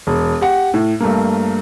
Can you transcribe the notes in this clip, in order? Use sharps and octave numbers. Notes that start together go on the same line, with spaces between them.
E1
G4 F#5
A2
G2 A3 A#3